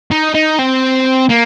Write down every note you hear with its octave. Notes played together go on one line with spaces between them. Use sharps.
D#4
D#4
C4
A#3